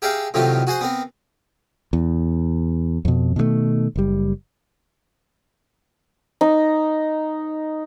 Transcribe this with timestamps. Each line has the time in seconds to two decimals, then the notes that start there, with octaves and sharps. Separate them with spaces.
0.02 G4 G#4 A#4 E5 F5 G5
0.34 A2 C3 D#3 F#3 F4 G4
0.67 F#4 G#4 C5 F#5
0.81 B3 C4 A#4
1.93 E2
3.05 F2 B2
3.36 B2 D#3 F#3 A3
3.96 F#1 G3
6.41 D#4